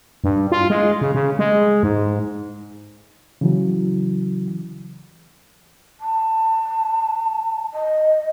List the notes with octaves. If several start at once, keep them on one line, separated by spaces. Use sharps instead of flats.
G2
F4
G#3
C#3
C#3
G#3
G#2
C#3 E3 F#3
A5
D#5